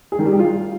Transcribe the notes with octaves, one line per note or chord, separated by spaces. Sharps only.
G#4
D#3
G3
G4
F4